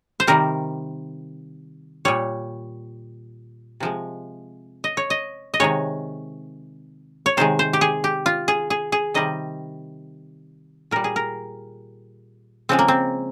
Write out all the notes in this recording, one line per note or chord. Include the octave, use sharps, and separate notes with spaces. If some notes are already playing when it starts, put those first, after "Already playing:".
C5
C3 D#3 G3 A#4
A#2 G3 C#5
C3 F3 G#3
D#5
C#5
D#5
D#5
C3 D#3 G#3 C#5
C#5
C3 D#3 G#3 C5
C5
G4
G#4
G4
F4
G#4
G#4
G#4
C3 D#3 G3 D#5
A#2 G3 A#4
G#4
A#4
C#3 F3 G#3 C4
A#3
C4